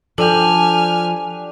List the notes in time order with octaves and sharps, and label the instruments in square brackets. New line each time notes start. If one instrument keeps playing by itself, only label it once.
[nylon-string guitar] F3 [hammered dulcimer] D4 G4 [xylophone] A4 [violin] G#5 F6